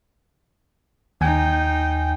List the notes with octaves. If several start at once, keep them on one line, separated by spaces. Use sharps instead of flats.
D#2 D#4 G5 G#5